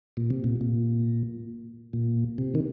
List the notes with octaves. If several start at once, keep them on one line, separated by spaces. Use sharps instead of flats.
A#2
C3
A#2
A#2
A#2
C3
D#3